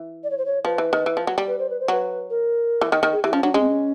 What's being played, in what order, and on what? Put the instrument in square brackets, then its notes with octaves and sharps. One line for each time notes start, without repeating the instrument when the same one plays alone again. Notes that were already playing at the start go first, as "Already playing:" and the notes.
Already playing: [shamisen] E3
[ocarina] D5
C#5
C5
C#5
[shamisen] F3 [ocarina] B4
[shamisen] E3
D#3
E3
F3
F#3
G3
[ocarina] B4
C5
B4
C5
[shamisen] F#3 [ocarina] B4
[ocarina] A#4
[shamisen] E3
D#3
D#3
[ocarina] G#4
[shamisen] E3 [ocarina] G4
[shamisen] F3 [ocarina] C#4
[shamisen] F#3 [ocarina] D4
[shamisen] G#3 [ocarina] C#4
[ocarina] C4
C#4